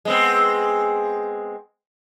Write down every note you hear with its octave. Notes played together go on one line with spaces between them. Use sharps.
G#3 B3 C4